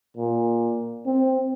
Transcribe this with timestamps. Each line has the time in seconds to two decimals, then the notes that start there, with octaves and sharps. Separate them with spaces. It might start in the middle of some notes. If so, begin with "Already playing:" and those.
0.17 A#2
1.06 C4